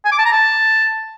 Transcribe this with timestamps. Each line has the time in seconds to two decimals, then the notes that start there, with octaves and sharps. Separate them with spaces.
0.05 G#5
0.12 D6
0.19 A5
0.25 A#5
0.32 A5